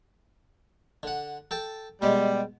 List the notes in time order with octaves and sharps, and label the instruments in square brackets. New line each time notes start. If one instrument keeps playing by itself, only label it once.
[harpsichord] D3 F#5
A4 G5 A5
[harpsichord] B2 G#3 [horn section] G3